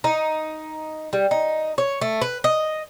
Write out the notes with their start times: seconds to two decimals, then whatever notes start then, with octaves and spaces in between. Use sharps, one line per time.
0.04 D#4
1.13 G3
1.31 D#4
1.78 C#5
2.01 A3
2.22 B4
2.44 D#5